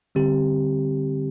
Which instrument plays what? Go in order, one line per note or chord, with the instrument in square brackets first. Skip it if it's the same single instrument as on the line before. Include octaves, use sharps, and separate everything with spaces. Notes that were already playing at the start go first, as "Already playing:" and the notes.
[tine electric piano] D3 G3 C4 G4